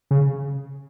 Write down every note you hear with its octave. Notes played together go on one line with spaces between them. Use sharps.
C#3